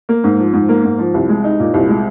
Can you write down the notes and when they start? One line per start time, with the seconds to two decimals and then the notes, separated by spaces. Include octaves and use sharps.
0.09 A#3
0.24 G#2
0.38 F3
0.53 G#2
0.69 A#3
0.84 G#2
0.98 F3
1.14 C2
1.29 G#3
1.44 D#4
1.60 A#2
1.74 C2
1.89 G#3